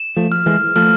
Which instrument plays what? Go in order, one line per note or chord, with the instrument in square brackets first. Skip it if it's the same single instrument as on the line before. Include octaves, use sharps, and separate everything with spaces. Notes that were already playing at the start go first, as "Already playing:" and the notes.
Already playing: [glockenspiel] E7
[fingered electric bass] F3 A3
[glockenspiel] F6
[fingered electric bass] E3 G#3
[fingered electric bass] F3 A3 [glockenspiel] F6